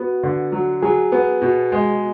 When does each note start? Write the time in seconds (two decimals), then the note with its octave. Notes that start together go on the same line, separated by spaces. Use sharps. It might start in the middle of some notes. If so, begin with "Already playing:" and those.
Already playing: B3 F#4
0.23 D3
0.52 F#3
0.83 F#3 G#4
1.12 B3
1.42 B2
1.72 G#3